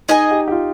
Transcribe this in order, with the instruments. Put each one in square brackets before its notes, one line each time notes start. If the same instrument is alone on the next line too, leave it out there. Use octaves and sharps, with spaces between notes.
[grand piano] D#4 [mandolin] G#4 D#5 G#5
[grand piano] G4
G4
F4